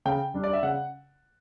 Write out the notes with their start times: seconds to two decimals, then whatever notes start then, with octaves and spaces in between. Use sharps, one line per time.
0.06 C#3 G5
0.34 G3 D4
0.44 D5
0.53 E5
0.63 C#3 F#5